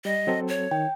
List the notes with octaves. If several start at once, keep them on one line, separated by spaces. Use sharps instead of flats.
G3 D#5
F#3 C4 A4
C#5
D#3 G5